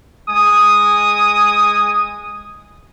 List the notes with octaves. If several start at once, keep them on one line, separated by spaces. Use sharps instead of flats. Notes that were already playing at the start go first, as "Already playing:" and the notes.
G#3 G#5 D#6